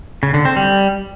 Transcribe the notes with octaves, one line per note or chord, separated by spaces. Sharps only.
C#3
D3
C4
G3